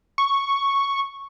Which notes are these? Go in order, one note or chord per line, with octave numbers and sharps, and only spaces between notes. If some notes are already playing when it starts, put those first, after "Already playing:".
C#6